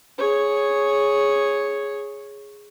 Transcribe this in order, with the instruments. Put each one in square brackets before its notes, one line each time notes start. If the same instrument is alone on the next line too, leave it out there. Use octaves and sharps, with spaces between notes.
[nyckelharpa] G#4 C#5